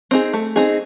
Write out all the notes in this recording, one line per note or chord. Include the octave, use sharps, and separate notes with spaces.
C4 D#4 G#4
A3
C4 D#4 G#4